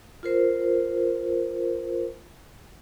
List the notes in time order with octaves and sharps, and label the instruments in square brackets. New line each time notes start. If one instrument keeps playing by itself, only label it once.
[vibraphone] F4 A#4 C5